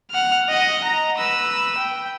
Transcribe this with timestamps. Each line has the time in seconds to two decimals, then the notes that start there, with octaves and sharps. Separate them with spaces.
0.11 F#5 F6
0.49 D#5 F#5
0.84 A#5
1.17 B4 E6
1.78 G5